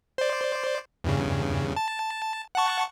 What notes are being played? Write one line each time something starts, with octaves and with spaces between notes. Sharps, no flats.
C5 D5
E2 G2 C#3
A5
F#5 A5 C#6